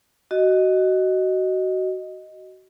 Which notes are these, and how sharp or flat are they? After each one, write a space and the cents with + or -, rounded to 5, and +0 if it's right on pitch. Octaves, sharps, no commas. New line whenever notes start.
F#4 +20 D#5 +0